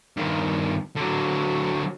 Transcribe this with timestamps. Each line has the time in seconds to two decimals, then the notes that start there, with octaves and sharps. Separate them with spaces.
0.17 G2 D#3
0.96 D3 F#3